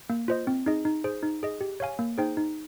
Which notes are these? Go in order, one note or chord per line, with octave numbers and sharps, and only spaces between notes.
A#3
F4 C5 D#5
C4
D#4 G#4 D#5
D#4
G#4 C5
D#4
G#4 D#5
G4
C#5 F5 G#5
A#3
D#4 G#4 C5 G5
D#4